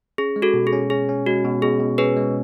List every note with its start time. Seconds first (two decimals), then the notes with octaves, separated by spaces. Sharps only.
0.18 C#4 G#4
0.36 G#3
0.42 F#4 A4
0.54 B2
0.67 G#4
0.73 C#4
0.90 C#4 G#4
1.09 C#4
1.26 G#3 F#4
1.44 B2
1.62 B2 G#4
1.80 B2
1.98 C#4 G#4 B4
2.16 G#3